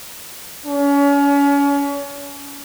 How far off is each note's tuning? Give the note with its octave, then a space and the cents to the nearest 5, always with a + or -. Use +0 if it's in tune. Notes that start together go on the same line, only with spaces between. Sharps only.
C#4 +35